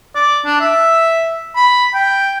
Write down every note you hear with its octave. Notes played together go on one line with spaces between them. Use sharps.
D5
D4
E5
B5
G5